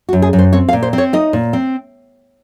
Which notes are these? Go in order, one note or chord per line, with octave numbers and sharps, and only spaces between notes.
F#4
F#2
G#4
F#2
C5
C4 C#5
F5
A#2
C5
C4
C#5
D#4 D#5
A#2
C4